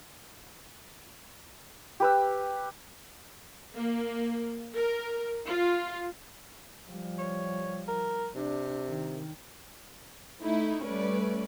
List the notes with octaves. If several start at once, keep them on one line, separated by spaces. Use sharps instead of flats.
G4 B4 E6
A#3
A#4
F4
F3 G3
C#5
A#4
C3 D4
D#3
A3 D#4 E4
G3 A3 C#4 B4 D5